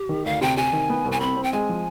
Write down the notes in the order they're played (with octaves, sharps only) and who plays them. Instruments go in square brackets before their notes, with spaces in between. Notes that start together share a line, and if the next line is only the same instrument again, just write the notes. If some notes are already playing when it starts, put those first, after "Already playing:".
Already playing: [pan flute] G4
[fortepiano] D#3
[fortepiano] D2 [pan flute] F5
[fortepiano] C3 [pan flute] G5
[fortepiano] C3 [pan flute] G#5
[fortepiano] D#3
B3
C2
[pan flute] G#5
[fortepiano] C4 [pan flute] B5
[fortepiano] C4
[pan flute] G5
[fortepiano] G#3 [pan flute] G#5
[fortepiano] F3